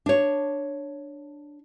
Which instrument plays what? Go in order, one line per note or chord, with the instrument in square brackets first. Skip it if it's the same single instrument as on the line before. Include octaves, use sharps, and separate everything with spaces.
[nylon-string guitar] D4 C#5